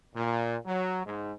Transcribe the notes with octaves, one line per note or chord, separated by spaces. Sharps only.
A#2
F#3
G#2